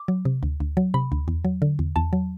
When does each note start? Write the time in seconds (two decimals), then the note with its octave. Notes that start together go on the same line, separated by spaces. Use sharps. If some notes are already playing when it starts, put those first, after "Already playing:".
Already playing: D6
0.08 F#3
0.25 C3
0.43 D2
0.60 D2
0.77 F#3
0.94 C3 B5
1.12 D2
1.28 E2
1.45 F#3
1.62 D3
1.79 E2
1.96 E2 A5
2.13 F#3